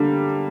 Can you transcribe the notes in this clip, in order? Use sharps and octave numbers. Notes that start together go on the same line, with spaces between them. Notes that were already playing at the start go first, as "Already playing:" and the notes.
Already playing: D3 G3 A#3